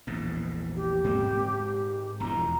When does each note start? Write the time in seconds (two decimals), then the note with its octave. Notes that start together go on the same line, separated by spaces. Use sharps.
0.07 A#1 E2 G#2
0.76 G4
1.04 G#2 G#3 C4
2.20 E1 E2 F3 A#5